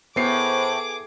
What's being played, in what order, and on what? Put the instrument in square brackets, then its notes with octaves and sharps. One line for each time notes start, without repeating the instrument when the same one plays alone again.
[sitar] A2 [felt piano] B3 C7 [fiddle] G#4 D6 [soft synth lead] C5